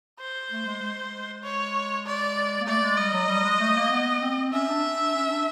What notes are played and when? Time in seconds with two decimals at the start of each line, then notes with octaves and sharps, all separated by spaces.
0.20 C5
0.51 A3
0.66 G#3
0.82 G#3
1.43 C#5
2.06 D5
2.60 A#3
2.67 A3 D5
2.82 G#3
2.98 G3 D#5
3.13 F#3
3.29 G3
3.44 G#3
3.60 A3
3.76 A#3
3.91 B3
4.22 C4
4.52 C#4 E5
4.68 D4
4.99 D4
5.15 C#4
5.31 D4